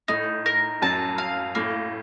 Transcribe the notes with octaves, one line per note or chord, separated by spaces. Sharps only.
A2 D#4
A#4
F#2 A5
F5
A2 A#3